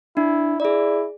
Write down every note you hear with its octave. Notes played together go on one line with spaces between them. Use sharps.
D4 E4
E4 G#4 D5